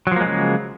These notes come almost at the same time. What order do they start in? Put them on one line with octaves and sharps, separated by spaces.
F#3 F3 A#3 G#3 C#3